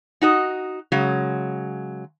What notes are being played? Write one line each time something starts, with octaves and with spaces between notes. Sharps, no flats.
D#4 F#4 D#5
C#3 F#3 G#3